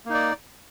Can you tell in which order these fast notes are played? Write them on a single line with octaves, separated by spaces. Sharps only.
A#3 D#4 D5